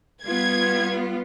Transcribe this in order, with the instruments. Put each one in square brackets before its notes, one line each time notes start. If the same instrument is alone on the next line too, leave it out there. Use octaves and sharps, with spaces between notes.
[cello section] G3 B3 F4 [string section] G#6